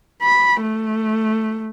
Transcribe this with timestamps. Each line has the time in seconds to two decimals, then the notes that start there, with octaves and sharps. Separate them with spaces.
0.22 B5
0.62 A3